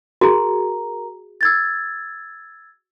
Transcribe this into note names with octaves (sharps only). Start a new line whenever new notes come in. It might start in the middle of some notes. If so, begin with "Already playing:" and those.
F#4 G#4 A#4 A#5
E6 G#6 A6